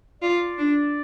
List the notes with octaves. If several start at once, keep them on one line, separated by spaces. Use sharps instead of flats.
F4 D5
D4